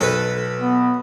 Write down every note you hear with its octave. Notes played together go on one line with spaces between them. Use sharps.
B1 A4 B4
B3